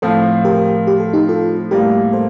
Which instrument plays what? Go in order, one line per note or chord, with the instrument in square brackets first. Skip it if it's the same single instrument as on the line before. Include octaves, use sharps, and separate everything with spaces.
[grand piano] A2 F3 C4 [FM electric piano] A4 C5
[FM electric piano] G4 A#4
G4
A4
D#4 G4
F4 A4
[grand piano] A2 G3 A#3 [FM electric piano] G4 A#4
[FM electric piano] A4 C5